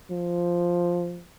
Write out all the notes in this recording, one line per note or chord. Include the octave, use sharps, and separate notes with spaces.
F3